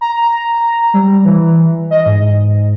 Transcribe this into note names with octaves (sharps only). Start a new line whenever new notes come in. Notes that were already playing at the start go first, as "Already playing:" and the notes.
A#5
G3
E3
D#5
G#2